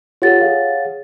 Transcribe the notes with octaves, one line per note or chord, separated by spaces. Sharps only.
F4 G4 A4 C#5 F#5 A6
G#4 F5